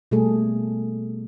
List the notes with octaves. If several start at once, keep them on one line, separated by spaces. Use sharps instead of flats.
B2 G3 A3 A#3 G#4 A4